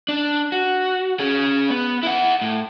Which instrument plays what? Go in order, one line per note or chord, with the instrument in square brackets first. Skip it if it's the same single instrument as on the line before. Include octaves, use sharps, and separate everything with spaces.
[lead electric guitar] D4
F#4
C#4 G#4
B3
E4 F#5
A2